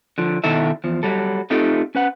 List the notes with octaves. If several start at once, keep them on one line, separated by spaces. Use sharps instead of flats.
D3 F3
B2 D#3 E4 A4 E5
E2 F3
F#3 G3 A4
A3 C4 D#4 F4 G4 A4
C#4 B4 F#5